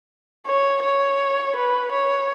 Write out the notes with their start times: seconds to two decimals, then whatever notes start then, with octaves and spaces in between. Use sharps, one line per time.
0.47 C#5
0.83 C#5
1.56 B4
1.92 C#5